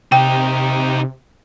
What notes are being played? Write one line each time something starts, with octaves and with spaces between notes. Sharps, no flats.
C3 D#4 G4 G5